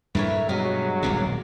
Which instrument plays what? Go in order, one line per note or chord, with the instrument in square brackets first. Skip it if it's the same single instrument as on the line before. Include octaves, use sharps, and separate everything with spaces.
[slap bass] G2 A#2 E3 [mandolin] A3 A#4 C#5 [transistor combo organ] B4
[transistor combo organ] G2 G#3 C#5 [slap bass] B2 [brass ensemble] F#3 [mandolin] D#5 F6
[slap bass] D#1 B1 C3 [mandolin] A#4 D5